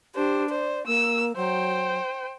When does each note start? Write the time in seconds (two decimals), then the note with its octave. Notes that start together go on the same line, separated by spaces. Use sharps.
0.15 D4 G4 C5
0.50 C5 D5
0.87 A#3 E6
1.36 F#3 C5 G5